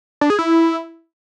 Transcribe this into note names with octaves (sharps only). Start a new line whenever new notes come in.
D4
G#4
E4